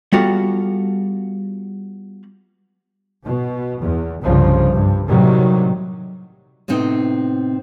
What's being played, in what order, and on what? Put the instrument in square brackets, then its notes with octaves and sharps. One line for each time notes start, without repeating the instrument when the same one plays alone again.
[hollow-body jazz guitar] G3 B3 F4 F#4 A4
[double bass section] B2
E2
C2 G2 C#3 F3
G2
A2 C3 D#3 F#3 G3
[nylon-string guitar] A2 C3 B3 C4 D#4